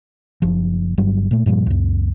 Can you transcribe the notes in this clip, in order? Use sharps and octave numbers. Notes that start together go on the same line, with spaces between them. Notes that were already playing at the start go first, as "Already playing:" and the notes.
F#1 F3
G1 G2 F#3 G3
A#2 A3
G2 A#2 F3 G3
C#2 F#2